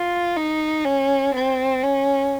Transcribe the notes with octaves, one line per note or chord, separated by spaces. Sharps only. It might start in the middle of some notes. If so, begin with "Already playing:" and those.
Already playing: F4
D#4
C#4
C4
C#4